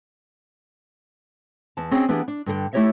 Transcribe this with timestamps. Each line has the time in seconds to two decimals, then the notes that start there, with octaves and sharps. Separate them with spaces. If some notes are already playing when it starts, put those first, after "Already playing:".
1.77 E2 A5
1.91 C4 C#4 F#4 G#4 D#5
2.08 E3 B3 D4 G4 G#4
2.28 D4
2.46 G2 D3 G#4 G5
2.73 A3 E4 G4 C#5 D#5 E5